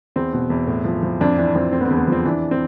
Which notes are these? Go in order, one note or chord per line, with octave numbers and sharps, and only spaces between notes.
E2 C4
B2
E2
A2
F3
F3
F2 D4
E3 D4
F2 C4
D3 C4
B3
C4
E2
B3
F3 C4
E3 D4
C4